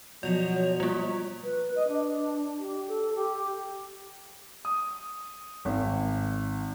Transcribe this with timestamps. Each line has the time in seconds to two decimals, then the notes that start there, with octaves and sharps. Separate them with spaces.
0.23 B2 F3 F#3 D5 F7
0.54 C#5
0.80 G3 A#3 F4
1.44 B4
1.76 D#5
1.88 D4
2.59 G4
2.88 A4
3.15 G4
4.65 D#6
5.65 G#1